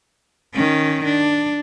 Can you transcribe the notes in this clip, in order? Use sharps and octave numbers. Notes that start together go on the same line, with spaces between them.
D#3 C#4
D4